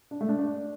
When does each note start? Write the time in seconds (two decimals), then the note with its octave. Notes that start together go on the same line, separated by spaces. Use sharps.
0.11 D4
0.21 A3
0.29 D4
0.39 D4